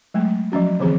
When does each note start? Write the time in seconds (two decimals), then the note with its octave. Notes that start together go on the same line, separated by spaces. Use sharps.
0.14 F#3 G#3 A3
0.52 F3 F#3 C#4 F#4
0.80 D3 E3 F3 C4 G#4